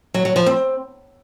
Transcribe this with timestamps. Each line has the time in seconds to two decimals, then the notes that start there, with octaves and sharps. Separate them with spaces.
0.14 F#3
0.25 F#3
0.36 F3
0.46 C4